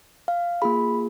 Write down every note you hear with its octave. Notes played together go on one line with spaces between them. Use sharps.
F5
A#3 F4 G#4 B5